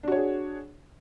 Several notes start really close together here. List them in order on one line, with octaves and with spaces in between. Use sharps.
D4 F#4 C#5 G#4